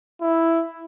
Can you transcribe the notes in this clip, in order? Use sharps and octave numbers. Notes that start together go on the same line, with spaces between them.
E4